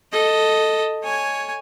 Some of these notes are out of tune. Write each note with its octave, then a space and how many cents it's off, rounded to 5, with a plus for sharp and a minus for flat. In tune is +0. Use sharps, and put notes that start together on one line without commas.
A4 +0 D#5 +0
C#5 +0 G#5 -5